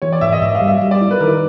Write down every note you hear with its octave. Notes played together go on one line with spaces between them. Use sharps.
E3 C#5
D5
G#2 E5
D#5
G#2 E5
F5
G3
E5
G3
D5
E4
B4
D#3 A#4